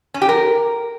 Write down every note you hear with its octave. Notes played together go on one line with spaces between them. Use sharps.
C#4
G4
A#4